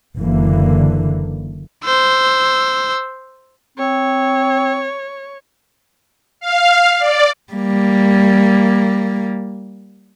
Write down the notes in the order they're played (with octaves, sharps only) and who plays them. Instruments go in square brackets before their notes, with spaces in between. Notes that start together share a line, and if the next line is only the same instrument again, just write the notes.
[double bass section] F#1 D3 E3 A#3
[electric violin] C5 E6
[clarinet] C4 [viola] C#5
[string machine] F5
D5
[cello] G3 A#3